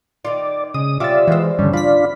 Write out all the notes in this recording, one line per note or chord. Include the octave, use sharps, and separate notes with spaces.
D#3 F4 D5
C#3 G#3 D#6
C3 G3 C#4 F4 E5 D6 A6
E3 G#3 F#4 C5
G2 D3 G3 C#4
D4 F4 D5 B5 B6